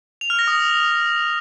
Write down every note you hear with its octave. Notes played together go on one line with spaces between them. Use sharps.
F7
F6
A#6
D#6